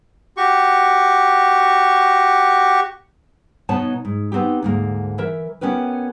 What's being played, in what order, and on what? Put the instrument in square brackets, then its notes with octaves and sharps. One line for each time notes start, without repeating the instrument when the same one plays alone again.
[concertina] F#4 G4 C#6
[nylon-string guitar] B2 B3 D#4 C#5 A5
G#2
B3 C4 D#4 G4
D2 G#2 A#3
E3 A#4 E5
B3 C#4 G4 A#4 B4